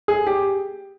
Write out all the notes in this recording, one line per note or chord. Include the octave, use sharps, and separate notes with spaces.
G#4
G4